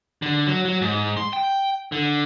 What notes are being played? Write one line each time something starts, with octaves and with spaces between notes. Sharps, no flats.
D3
F#3
F#3
G#2
C6
G5
D3